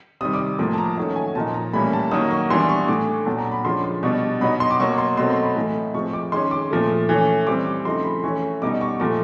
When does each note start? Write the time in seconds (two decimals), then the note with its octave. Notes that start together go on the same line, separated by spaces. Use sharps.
0.21 C3 D#3 G3 D#6
0.33 D6
0.59 A2 F3 A#3 D6
0.73 A5
0.78 A#5
0.97 D#3 F#3 A3 C#4 A5
1.16 G#5
1.35 A#2 F3 A#3 D#4 A5
1.54 A#5
1.73 A2 E3 G3 A#3 C#4 B5
1.93 A5
2.11 D#3 F#3 A#3 D#6
2.31 C#6
2.50 E3 G3 B3 D4 C6
2.69 C#6
2.88 A2 E3 A3 D6
3.25 A#2 F#3 B3 D4 A5
3.39 A#5
3.52 B5
3.65 D3 F3 G#3 C#4 C6
3.84 C6
4.03 B2 G3 B3 D4 C#6
4.41 B2 F#3 B3 D#4 B5
4.60 C6
4.71 D6
4.79 B2 F#3 A#3 C#6
4.98 C6
5.17 B2 F#3 A3 C4 C6
5.30 C6
5.43 B5
5.56 A2 E3 A3
5.94 A2 F3 G#3 C4 C#6
6.13 D6
6.32 D#3 G#3 C#4 C6
6.51 D6
6.71 A#2 F3 A3
7.09 E3 A3 C#4
7.47 E3 G3 C4 D6
7.67 D6
7.85 C#3 F3 A3 C4 D#4 C6
8.04 B5
8.24 E3 A3 C#4 C#6
8.62 B2 G3 B3 D#4 D6
8.81 C#6
9.00 A#2 F3 A3 D6